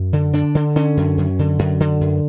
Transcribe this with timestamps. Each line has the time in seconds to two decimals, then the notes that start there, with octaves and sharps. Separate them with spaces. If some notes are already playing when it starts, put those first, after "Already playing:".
Already playing: F#2
0.13 D3
0.33 D3 D4
0.55 D3
0.76 D3 C#4
0.97 F#2
1.18 F#2
1.39 D3
1.59 F#2
1.80 D3
2.01 F#2